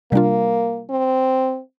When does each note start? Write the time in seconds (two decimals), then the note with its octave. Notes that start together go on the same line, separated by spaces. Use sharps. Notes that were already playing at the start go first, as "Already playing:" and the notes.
0.12 C3 G3 A#3 D4 F4
0.90 C4